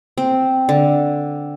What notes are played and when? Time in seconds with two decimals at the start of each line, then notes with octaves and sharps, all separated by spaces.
0.18 C4
0.69 D3